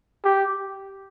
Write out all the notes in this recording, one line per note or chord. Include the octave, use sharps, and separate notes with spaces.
G4